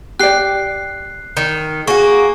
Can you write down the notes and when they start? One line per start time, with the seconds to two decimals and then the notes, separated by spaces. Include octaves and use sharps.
0.20 G4 D5 F#6 C7
1.37 D#3
1.87 A#3 F#4 G#4 C#6